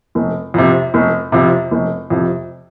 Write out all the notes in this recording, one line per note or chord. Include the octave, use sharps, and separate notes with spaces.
F1
F2 C3
F1
F2 C3
F1
F2 C3